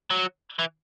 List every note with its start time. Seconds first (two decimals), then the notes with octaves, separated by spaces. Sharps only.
0.10 F#3
0.59 E3